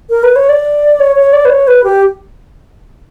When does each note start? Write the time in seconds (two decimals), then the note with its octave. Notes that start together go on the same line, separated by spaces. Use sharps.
0.10 A#4
0.23 B4
0.36 C#5
0.49 D5
1.00 C#5
1.16 C#5
1.33 D5
1.45 B4
1.50 C#5
1.67 B4
1.84 G4